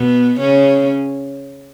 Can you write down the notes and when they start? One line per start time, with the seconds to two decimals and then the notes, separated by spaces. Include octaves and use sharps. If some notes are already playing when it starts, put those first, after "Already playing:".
Already playing: B2 B3
0.40 C#3 C#4